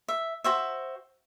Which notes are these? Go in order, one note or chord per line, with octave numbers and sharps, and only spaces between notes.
E5
F#4 C5 E5